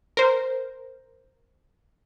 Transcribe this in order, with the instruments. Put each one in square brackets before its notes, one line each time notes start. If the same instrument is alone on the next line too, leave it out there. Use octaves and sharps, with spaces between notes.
[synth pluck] A#4 C5